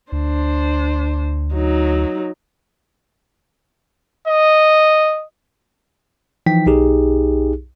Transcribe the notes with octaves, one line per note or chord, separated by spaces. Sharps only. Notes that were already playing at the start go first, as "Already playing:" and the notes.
D2 D4 C5
F#3 D#4
D#5
E3 F3 D#4 G5 B6
B1 D#4 G4 G#4